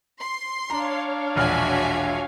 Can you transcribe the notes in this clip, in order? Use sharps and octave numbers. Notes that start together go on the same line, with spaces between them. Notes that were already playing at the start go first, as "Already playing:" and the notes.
C6
D4 C#5 F5 A#5
E1 A#1 F#4 E5 G#5 F6